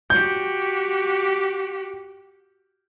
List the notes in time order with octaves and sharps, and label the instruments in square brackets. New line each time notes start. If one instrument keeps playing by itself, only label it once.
[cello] F#4 G4 [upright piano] G6